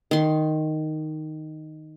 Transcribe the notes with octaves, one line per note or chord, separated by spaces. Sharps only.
D#3 C6